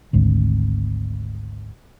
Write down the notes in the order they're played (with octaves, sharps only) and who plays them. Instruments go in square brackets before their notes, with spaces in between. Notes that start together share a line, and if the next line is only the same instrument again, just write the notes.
[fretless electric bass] G#1 D2